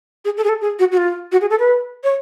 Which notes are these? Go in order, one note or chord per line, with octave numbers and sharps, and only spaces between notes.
G#4
A4
G#4
A4
G#4
F#4
F#4
F4
F#4
G#4
A4
B4
C#5